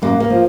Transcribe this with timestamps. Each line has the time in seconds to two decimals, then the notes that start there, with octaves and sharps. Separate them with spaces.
0.02 F#2 A#3
0.20 A#3
0.30 F3